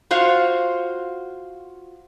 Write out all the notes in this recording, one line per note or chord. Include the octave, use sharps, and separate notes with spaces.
F4 F#4 C5 F5